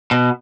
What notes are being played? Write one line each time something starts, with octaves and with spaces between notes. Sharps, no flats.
B2